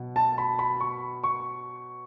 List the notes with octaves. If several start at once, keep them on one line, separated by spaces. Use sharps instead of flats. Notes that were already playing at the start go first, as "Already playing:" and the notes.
Already playing: B2 F#3 B3
A5
B5
B5
C#6
C#6